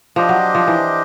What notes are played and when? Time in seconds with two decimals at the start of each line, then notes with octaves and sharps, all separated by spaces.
0.16 F3 D4 G4 C5 D#5
0.29 F#3
0.55 F3
0.68 E3